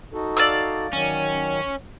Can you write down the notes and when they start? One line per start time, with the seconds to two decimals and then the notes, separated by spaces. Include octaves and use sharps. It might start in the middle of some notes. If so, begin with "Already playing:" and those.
0.13 D#4 F#4 A4
0.37 D5 F5 E6
0.93 D#3 F#3 C#4